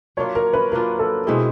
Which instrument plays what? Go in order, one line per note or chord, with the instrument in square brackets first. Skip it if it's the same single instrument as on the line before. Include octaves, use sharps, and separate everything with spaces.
[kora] F#3 A#3 D4 F4 [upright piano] C#5
[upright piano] A#4
B4
[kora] F#3 A#3 D4 F4 [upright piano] A#4
[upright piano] A4
[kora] B2 G#3 C4 E4 [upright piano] G#4